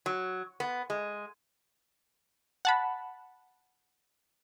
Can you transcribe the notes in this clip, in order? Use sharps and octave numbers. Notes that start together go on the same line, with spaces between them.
F#3
B3
G#3
F#5 A5 B5